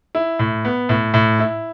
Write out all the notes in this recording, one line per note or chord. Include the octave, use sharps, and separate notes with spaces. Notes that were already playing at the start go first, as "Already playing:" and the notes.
E4
A2
B3
A2
A2
E4